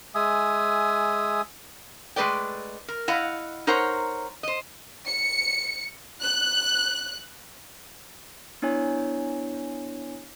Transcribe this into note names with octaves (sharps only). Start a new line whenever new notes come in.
G#3 E5 G#5 D#6
G#3 A3 B4 D5 G5
A#4
E4 D#5 F5 F#5
D#4 A#4 C5 C#5 F#5 A#5
C5 D#5
C#7
F#6
B3 D4 E4 C#5 G#5